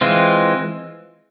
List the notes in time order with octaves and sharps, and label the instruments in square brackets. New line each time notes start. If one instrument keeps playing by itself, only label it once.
[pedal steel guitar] E3 G#3 C4 F4